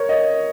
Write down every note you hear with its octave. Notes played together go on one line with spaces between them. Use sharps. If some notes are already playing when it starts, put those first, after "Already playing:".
Already playing: A#4 C#5
D#5